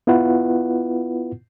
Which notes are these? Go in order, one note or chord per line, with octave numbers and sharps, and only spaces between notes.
B3 E4 F4 B4 F#5